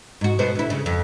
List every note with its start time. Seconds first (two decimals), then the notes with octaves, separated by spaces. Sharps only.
0.21 G#2 F#4
0.39 B2 B3 C5
0.55 D2 E4
0.70 C#3
0.86 F2